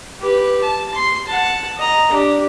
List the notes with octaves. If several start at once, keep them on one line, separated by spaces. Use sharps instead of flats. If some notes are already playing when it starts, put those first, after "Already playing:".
G4 B4
A5
C6
F#5 A5
D#5 A#5
D4 G4